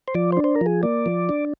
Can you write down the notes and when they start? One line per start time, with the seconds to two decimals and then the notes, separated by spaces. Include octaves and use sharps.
0.08 C5
0.15 F3 D5
0.32 C5
0.37 D4
0.44 C5
0.56 A#4
0.61 F3 G#4
0.83 A#3 D5
1.06 F3
1.29 D4